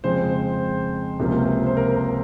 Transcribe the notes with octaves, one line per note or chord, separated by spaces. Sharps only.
F2 C#3 G#3 C4 C5
C#2 C3 F3 A#3 C#4
C5
A#4
A#4